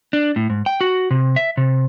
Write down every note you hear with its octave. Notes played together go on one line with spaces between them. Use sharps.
D4
A2
G#2
G5
F#4
C3
E5
C3